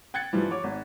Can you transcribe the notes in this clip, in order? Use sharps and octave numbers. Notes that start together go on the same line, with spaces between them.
G5 F#6 G#6 A6 C#7
G2 E3 F3 G3
C#5 D6
G#1